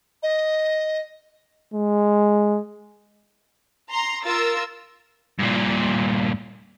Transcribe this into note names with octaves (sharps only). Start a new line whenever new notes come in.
D#5
G#3
A#5 C6
F4 A#4 E6 A6
G2 A#2